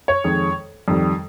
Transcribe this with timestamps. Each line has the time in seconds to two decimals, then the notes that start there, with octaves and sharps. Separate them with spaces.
0.08 C#5
0.24 F2 D#3 G#3
0.88 F2 D#3 G3